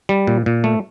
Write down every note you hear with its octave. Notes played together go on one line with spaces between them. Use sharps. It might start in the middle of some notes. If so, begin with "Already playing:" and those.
G3
A#2
A#2
A3